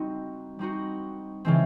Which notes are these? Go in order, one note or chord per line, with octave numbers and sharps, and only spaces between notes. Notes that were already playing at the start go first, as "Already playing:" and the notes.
Already playing: G3 C4 D#4 F#4
G3 C4 D#4 F#4
C#3 E3 G#3 C4